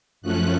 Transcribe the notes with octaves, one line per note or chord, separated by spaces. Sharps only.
F#2 F3 A3 C#4 F#6